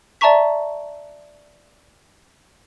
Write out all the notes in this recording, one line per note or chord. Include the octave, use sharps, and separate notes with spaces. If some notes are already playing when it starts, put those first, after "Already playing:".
D5 E5 A5 A#5 C#6 B6